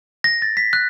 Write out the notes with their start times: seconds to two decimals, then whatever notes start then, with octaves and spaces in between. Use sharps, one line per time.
0.24 A#6
0.42 A6
0.57 B6
0.73 F#6